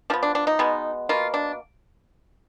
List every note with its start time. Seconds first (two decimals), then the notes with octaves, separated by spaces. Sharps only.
0.10 F3 B3 D4
0.23 D4
0.35 D4
0.47 D#4
0.59 B2 G#3 B3
1.09 B2 A#3 F4
1.34 D4